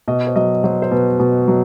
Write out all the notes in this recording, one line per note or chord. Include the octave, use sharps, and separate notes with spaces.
B2 D#5
C5
F#3 D#5
F#3 C5
C5
B2 B4
B2
F#3